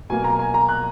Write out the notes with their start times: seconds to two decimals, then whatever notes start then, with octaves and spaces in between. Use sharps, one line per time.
0.10 B2 F#3 A#3 G#5
0.24 A#5
0.39 G#5
0.54 A#5
0.69 F#6